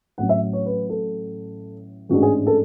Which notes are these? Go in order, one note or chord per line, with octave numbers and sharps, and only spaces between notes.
A1 A2 F#3 F#5
E5
C#5
B4
A4
A1 G#2 G#3 D4 F#4
G#4
A4